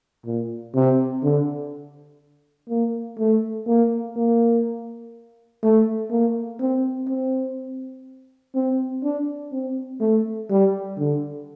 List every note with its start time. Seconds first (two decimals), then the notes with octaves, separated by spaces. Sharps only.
0.26 A#2
0.75 C3
1.23 D3
2.69 A#3
3.19 A3
3.67 A#3
4.16 A#3
5.63 A3
6.11 A#3
6.60 C4
7.09 C4
8.55 C4
9.04 D4
9.52 C4
10.01 A3
10.50 G3
10.98 D3